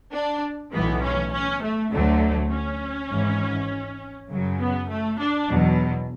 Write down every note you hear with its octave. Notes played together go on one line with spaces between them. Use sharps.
D4
B1 A2 E3 B3
C#4
C#4
A3
D2 D3 F#3 A3
C#4
G#1 G#2 E3
F#2 C#3 F#3
B3
A3
D4
E2 B2 F#3